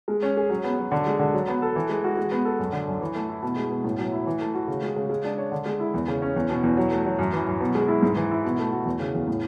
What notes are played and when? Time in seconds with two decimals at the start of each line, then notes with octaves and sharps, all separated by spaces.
0.08 G#3
0.23 C#4
0.37 G#4
0.50 F#3
0.64 B3
0.79 F#3
0.92 D3
1.07 G#3
1.19 D3
1.34 F#3
1.48 B3
1.62 A4
1.75 E3
1.89 G#3
2.04 F#4
2.17 G#3
2.32 B3
2.45 A4
2.59 F#2
2.73 D3
2.87 F#2
3.01 E3
3.15 A3
3.29 E4
3.42 B2
3.57 G#3
3.70 B2
3.84 A2
3.99 F#3
4.12 E4
4.27 E3
4.41 A3
4.55 F#4
4.68 C#3
4.82 G#3
4.96 C#3
5.09 G#3
5.25 D4
5.38 C#5
5.52 D3
5.66 G#3
5.80 E4
5.94 E2
6.08 C#3
6.22 C#4
6.36 E2
6.50 B2
6.63 E2
6.77 F#3
6.91 A3
7.06 F#3
7.19 F#2
7.33 E3
7.47 F#2
7.60 B2
7.75 G#3
7.88 E4
8.03 G#2
8.16 E3
8.31 E4
8.45 B2
8.59 A3
8.72 F#4
8.86 E2
9.00 C#3
9.14 E2
9.27 A2